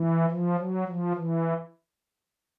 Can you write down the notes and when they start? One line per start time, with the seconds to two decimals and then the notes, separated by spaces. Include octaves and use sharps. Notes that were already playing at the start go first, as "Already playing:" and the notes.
Already playing: E3
0.31 F3
0.58 F#3
0.87 F3
1.15 E3